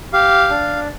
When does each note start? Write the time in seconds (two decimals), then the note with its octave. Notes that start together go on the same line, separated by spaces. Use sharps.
0.13 G4 F5
0.50 D4